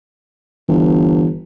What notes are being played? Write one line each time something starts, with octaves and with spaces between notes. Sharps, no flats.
G1 E3